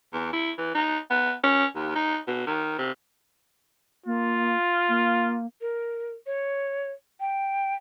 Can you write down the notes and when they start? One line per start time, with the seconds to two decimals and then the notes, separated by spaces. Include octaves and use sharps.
0.13 E2
0.33 E4
0.58 E3
0.74 D#4
1.10 B3
1.44 C#4
1.75 D#2
1.95 D#4
2.27 B2
2.47 D#3
2.79 C3
4.06 A#3 F4
4.89 A#3
5.61 A#4
6.26 C#5
7.20 G5